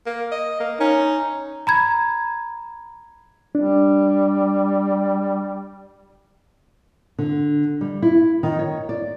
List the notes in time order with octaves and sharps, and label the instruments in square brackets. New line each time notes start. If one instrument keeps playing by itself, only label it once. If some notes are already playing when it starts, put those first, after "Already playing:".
[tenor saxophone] A#3
D#5
A#3
[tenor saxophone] C#4 [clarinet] D#4
[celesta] A#5 B5 G#6
[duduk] G3 [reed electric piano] D4
[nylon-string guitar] D3
G3
E4
D#3
C#5
D5